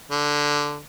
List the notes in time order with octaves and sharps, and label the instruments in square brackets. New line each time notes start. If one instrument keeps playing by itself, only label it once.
[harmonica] D3